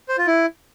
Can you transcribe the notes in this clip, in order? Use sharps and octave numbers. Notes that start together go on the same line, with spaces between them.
C5
F4
E4